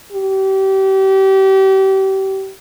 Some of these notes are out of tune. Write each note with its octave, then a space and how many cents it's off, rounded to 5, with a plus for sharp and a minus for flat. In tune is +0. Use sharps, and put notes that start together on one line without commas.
G4 -30